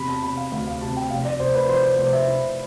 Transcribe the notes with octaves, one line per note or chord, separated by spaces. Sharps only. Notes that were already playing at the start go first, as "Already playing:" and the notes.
Already playing: E2 C3 B5
A5
C3 B5
F5
D2 F5
F5
C3 A5
G5
F1 F5
D5
F1 C5
B4
F3 C5
C5
F1 C5
E5
E4